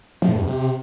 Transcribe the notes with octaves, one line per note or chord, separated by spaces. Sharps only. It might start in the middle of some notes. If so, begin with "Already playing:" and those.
F3
A2
G2
E2
C3